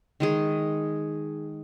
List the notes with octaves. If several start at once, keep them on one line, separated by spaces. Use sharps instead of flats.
D#3 G#3 G#4